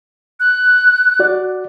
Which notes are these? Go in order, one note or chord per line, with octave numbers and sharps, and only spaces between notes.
F#6
F#4 D5